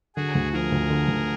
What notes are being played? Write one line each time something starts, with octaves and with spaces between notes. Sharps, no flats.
D3 F#4 G#4
D2
F3 G#4 A#4
D2
D3
D2